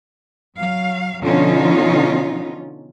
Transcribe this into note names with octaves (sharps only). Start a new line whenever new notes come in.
F#3 F5
B2 D3 F3 C#4 D#4 F4